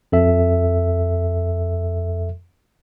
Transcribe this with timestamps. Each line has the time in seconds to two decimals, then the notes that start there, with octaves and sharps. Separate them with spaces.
0.12 F2 A4 E5